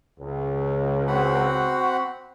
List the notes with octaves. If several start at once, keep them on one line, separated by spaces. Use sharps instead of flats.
C#2
C4 F#4 F#5 B5